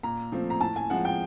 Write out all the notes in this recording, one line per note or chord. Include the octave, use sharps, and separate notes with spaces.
A#2 A#5
F3 A3 C4
A#5
A2 A5
G#5
F3 G#3 C4 F#5
G5